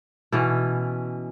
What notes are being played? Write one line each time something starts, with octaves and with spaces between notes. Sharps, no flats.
B2 E3 C#4